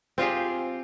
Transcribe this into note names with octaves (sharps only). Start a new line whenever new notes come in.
C4 F4 G4 G#4